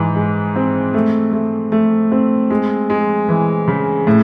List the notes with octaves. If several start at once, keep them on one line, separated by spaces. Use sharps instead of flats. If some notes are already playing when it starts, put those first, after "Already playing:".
Already playing: G#2 E3
G#3
C4
A3
A3
A3
C4
G#3
G#3
E3
C#3
A2